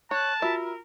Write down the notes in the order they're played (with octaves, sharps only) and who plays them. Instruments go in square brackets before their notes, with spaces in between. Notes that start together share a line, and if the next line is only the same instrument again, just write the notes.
[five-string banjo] C#5 [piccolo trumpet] A5 [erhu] F#6
[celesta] F4 F#4 B5 [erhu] A#4 [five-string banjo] E5